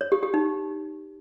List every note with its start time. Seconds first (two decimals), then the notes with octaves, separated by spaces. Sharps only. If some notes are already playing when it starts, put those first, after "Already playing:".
0.01 C#5
0.12 G4
0.23 G4
0.34 D#4